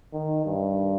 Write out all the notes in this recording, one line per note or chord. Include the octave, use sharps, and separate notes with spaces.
D#3
G2